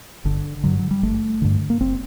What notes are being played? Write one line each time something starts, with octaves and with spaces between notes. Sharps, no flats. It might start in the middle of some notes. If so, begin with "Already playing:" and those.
G1 D3
G2 D3 F#3
F#3
G3
G1 A3
G2 D3
A#3
F#1 C4